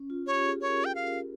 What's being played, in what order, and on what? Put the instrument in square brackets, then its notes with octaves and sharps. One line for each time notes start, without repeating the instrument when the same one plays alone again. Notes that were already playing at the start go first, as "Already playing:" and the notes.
Already playing: [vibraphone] C#4
F4
[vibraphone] G4 [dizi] C#5
[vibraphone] G#4
[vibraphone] A#4 [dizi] C#5
[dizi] G5
F5
[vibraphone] A#4